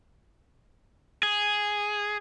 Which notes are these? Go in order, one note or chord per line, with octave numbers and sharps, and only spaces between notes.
G#4